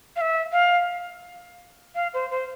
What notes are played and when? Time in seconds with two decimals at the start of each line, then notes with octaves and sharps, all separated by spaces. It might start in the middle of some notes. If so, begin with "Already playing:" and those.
0.16 F5
0.21 E5
0.52 F5
1.95 F5
2.14 C5
2.31 C5